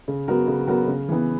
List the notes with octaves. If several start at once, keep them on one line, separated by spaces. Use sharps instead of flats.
C#3
F#3 B3 F#4 A#4
C#3
F#3 B3 F#4 A#4
C#3
E3 B3